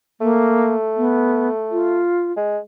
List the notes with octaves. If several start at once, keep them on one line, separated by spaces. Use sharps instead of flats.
A3 A#3
B3
F4
G#3